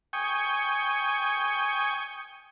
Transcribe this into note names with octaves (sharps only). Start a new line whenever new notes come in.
G5 G#5 C#6 D#6